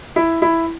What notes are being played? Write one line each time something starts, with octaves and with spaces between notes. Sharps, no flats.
E4
E4